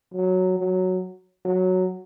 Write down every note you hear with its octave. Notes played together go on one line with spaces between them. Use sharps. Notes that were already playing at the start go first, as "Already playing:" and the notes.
F#3
F#3
F#3